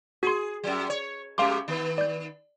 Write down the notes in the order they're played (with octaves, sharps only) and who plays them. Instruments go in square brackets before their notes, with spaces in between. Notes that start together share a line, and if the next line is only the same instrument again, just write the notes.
[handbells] F#4 C6 [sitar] G#4
[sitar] F#2 F#3
C#5
[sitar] F#2 G#3 G4 [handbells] F5 C6 D6
[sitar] D#3 B3
[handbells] D5 G6